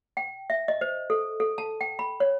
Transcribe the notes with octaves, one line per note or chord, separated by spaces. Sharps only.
G5
E5
D#5
C5
A4
A4
A5
G5
B5
C#5